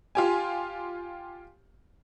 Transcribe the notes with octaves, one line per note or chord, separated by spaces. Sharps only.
F4 G4 G#5